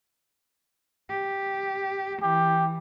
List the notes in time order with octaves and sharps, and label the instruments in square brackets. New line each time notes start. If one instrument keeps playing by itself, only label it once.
[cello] G4
[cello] E3 [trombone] G4